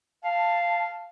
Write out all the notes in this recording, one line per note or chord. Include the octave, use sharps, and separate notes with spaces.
F5 A5